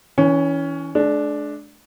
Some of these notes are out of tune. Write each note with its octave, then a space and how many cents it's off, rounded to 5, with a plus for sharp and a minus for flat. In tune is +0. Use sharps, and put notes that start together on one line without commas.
E3 -20 C#4 +15
G#3 +45 D4 +0